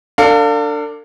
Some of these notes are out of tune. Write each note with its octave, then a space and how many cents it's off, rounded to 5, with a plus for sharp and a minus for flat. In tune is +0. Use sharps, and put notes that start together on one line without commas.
D4 +0 A4 +40 F5 +15